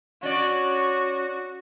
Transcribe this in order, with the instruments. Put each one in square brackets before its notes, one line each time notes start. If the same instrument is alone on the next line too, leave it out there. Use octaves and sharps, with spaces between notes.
[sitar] C#4 D5 [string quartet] F#4